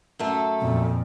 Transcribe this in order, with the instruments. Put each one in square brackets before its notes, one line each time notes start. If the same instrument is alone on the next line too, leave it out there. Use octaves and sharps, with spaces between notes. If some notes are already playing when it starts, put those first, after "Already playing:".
[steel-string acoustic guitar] F#2 A3 A4
[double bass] F2 A#2